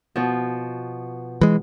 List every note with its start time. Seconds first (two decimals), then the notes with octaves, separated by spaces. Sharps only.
0.16 B2 F3
1.41 E3 G#3